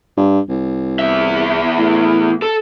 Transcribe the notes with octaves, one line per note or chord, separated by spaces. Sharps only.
G2
C2
E2 E5
A2
A4